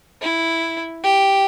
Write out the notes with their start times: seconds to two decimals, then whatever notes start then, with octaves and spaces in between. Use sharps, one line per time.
0.22 E4
1.03 G4